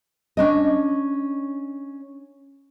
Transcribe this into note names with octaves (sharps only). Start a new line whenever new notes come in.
C#4 D4 D#5